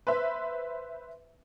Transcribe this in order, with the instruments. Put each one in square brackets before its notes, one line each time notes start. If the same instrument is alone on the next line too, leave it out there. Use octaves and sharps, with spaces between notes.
[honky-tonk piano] B4 C5 E5